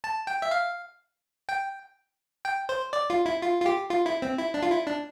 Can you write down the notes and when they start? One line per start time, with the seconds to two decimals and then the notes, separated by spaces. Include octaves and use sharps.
0.04 A5
0.27 G5
0.42 E5
0.51 F5
1.49 G5
2.45 G5
2.69 C5
2.93 D5
3.10 F4
3.26 E4
3.42 F4
3.61 F4
3.66 G4
3.90 F4
4.06 E4
4.22 C4
4.38 E4
4.54 D4
4.63 F4
4.70 E4
4.87 D4